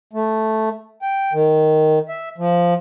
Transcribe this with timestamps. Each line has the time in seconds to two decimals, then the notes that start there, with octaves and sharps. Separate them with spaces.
0.13 A3
1.02 G5
1.33 D#3
2.09 E5
2.38 F3